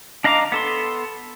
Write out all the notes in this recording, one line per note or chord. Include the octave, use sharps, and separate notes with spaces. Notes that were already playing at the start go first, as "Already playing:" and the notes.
D4 D#5 F5 A#5 D6
B3 A4 C6